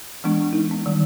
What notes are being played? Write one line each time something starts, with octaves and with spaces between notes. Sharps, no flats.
E3 G#3 B3 D4
D#4
B3
D#3 G3